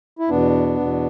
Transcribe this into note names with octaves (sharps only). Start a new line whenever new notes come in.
E4
E2 B2 B3 D4
E2 B2